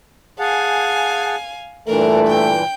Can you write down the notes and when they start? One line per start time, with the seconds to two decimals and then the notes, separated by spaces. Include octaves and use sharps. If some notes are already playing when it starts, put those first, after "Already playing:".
0.39 G#4 F5 F#5 G#5 A5
1.87 G2 A#2 E3 A3 D4 A#4
2.27 G5